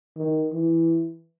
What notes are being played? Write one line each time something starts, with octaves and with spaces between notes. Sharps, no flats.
D#3
E3